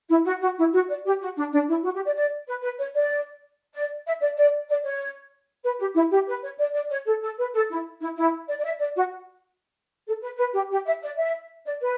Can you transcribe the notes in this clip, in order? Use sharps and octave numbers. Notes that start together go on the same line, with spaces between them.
E4
F#4
F#4
E4
F#4
D5
G4
F#4
D4
D4
E4
F#4
G4
D5
D5
B4
B4
C#5
D5
D5
E5
D5
D5
D5
C#5
B4
G4
E4
G4
B4
C#5
D5
D5
C#5
A4
A4
B4
A4
E4
E4
E4
D5
D5
E5
D5
F#4
A4
B4
B4
G4
G4
E5
D5
E5
D5
B4